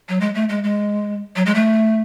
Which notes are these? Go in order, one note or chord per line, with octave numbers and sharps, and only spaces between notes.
F#3
G#3
A3
G#3
G#3
F#3
G#3
A3